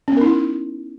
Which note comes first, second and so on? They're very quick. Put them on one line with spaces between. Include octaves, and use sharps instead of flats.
C#4 B3 A#4 D#4 E4